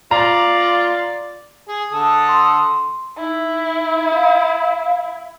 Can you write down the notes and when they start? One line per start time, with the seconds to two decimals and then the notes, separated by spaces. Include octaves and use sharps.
0.11 F4 D5 A#5
1.68 G#4
1.91 D3 A4 D#6
2.29 C6
3.18 D#4 E4
4.14 F5